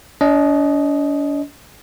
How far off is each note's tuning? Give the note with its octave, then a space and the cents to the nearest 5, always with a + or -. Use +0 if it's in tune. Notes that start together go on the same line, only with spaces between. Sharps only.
D4 -45 D#5 +5